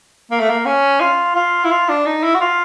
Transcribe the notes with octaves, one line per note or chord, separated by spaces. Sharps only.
A#3
A3
A#3
C#4
F4
F4
E4
F4
D4
D#4
E4
F#4
F4